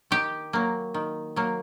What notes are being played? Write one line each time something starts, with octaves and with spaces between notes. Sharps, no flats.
D#3 G4
F#3 A#3
D#3
F#3 A#3